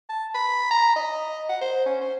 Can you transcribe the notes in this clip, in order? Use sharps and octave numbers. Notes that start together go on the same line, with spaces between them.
A5
B5
A#5
D#5
F#5
C5
C#4
C5